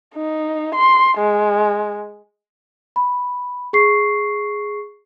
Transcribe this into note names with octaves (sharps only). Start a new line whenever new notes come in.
D#4
C6
G#3
B5
G#4 C#6 C7